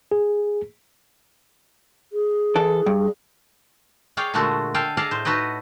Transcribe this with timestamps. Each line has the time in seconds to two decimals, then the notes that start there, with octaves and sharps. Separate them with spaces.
0.12 G#4
2.13 G#4
2.56 E3 A4
2.86 G2
4.17 G#4 C#5 D5 F5 G5
4.34 A#2 D3 G#3 A3 F#4 A4
4.74 A4 F5 G5 G#5
4.97 G#4 A4 D5 D#5 F5
5.11 A2 C5
5.25 D#4 F#4 A4 B4 C#5 D#5